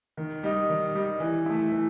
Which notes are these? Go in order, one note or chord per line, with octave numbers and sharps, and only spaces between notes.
D#3
G3 D#4
D#3
G3 D#4
E3
A3 E4
E3